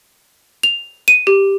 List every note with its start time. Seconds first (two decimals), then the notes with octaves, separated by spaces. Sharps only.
0.63 F7
1.08 D#7
1.27 G4